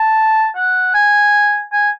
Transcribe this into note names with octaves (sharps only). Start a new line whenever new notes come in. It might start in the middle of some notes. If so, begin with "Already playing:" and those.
Already playing: A5
F#5
G#5
G#5